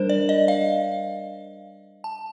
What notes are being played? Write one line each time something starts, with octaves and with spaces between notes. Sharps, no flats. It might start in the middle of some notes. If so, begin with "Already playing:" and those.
Already playing: G3 D4 A#4 C5
D5
D#5
F5
A5